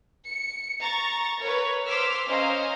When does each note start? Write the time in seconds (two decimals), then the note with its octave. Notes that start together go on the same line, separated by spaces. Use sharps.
0.28 C#7
0.79 A#5 C#6 A6
1.42 A#4 B4 C#5
1.86 C5 C6 D6 E6 F6 B6
2.27 C#4 C5 D#5 F5 A#5